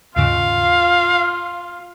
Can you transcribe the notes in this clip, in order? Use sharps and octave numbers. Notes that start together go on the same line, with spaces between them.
D#2 G#2 C#3 F4 F5